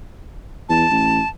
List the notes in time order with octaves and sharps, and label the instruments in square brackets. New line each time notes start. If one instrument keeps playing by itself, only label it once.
[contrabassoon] E2 [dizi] A5
[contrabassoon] A1